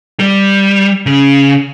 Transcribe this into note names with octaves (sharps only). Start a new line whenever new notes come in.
G3
C#3